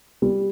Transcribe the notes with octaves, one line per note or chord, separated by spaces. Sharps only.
G3